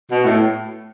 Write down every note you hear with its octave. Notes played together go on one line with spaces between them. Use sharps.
B2
A2